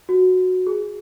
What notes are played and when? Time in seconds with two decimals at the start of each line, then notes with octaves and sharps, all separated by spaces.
0.09 F#4
0.67 G#4